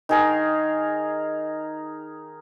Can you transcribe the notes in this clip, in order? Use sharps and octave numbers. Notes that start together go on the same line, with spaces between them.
D#3 G#4 A#4